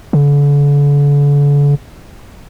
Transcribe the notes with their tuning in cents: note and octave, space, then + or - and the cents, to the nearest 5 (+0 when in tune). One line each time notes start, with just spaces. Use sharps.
D3 -40